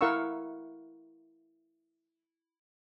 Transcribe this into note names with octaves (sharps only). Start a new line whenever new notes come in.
E4 A#4 F5 F#5 C#6 E6